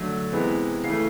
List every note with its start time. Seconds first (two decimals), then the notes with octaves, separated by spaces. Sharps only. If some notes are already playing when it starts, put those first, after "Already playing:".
Already playing: D3 F#3 A3
0.32 C3 E3 G#3 B3
0.84 C#3 E3 A3 C7